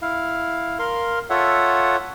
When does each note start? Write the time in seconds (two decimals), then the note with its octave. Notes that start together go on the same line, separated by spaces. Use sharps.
0.02 E4 F5
0.79 A#4 F5 C6
1.30 F4 A4 C#5 E5 F#5